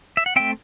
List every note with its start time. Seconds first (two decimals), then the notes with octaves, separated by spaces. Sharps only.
0.17 E5
0.26 F#5
0.36 A3 C4 E5 G5